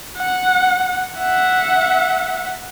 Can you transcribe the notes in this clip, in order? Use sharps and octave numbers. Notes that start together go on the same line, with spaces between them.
F#5
E5 F#5